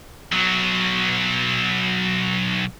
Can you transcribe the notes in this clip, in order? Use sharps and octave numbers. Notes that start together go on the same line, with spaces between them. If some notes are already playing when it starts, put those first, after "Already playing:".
B1 F#3